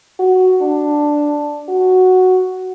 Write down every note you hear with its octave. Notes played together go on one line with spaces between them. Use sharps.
F#4
D4
F#4